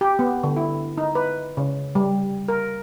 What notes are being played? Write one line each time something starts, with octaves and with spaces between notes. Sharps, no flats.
G4
B3
D3
E4
D#4
B4
C#3
G3
A#4